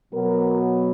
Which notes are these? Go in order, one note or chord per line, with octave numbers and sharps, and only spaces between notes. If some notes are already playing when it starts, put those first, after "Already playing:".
B2 F#3 B3 A#4